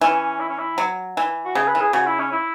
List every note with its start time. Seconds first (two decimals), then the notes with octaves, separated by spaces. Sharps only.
0.01 E3 C#4
0.40 E4
0.49 C#4
0.58 E4
0.78 F#3
1.17 E3
1.45 F#4
1.55 C#3 G#4
1.68 B4
1.75 E3
1.81 G#4
1.93 C#3 F#4
2.06 E4
2.19 C#4
2.32 E4